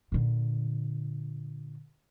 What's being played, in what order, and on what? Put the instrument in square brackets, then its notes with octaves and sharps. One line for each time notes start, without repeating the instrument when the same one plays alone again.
[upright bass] A#2 D3